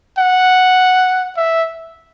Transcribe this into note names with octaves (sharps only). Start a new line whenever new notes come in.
F#5
E5